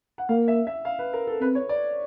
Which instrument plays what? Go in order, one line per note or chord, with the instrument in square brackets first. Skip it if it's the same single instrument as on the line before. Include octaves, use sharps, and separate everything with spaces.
[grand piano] F#5
[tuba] A#3 [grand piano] F5
[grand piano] E5
E5
F5
B4
A#4
A4
[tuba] C4 [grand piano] B4
[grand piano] C#5
D5